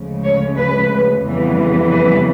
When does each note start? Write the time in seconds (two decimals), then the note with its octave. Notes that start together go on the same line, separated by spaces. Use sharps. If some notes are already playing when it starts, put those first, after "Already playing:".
Already playing: D2 C#3 F3 G#3 C#4
0.24 C#5
0.56 B4
1.23 F2 C#3 E3 G3 B3
1.89 B4